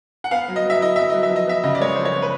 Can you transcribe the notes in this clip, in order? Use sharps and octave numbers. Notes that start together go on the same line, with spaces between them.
F#5
B3 F5
F#3
D#5
F#3
E5
E4 D#5
B3 E5
F#3 D#5
E5
F3
D#5
B3 E5
C#3 D#5
D5
G#3 C#5
F3 C5
C#5
B3
B4